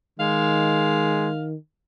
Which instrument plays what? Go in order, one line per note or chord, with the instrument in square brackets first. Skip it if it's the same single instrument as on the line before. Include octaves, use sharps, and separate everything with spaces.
[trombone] D#3 [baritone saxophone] G#3 [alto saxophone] F5